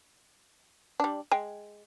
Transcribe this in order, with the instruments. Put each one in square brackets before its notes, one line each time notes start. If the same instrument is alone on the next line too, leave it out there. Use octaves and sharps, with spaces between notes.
[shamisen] G3 D4
[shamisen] G#3 [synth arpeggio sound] G5